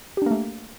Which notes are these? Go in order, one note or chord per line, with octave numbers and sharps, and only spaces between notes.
A3 A#3 D4 G4